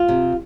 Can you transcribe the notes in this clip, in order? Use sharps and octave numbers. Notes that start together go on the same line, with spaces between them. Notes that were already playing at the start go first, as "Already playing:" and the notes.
Already playing: F4
C3